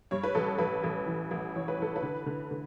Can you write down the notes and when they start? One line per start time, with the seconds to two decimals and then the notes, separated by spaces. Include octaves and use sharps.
0.11 G2 C#5
0.23 B4
0.35 A1 A4
0.58 A1 B4
0.84 A1
1.06 E3
1.31 A1
1.56 E3 C#5
1.68 B4
1.79 E3 A4
1.96 B4
2.02 D3
2.26 D3
2.51 D3